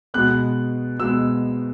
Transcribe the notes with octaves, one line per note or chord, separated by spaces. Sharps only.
B2 G#3 B3 F#6
B2 G#3 B3 E6